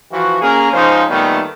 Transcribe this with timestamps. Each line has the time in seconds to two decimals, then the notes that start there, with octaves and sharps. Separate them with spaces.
0.12 E3 F3 F#4
0.42 A#3 C#4 G#4 A#4
0.73 C#2 F3 C#4 D#4 C5
1.09 A#2 D#3 G3 A3 B3